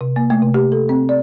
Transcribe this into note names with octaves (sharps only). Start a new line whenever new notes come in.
C3
A#3
A3
C3
G4
A4
C4
D5